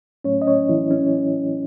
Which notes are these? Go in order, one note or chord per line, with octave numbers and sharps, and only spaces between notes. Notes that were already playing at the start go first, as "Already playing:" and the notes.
A2 F#3 A3 C#4 C#5
D#5
C#4 C#5
E3 E4
C#4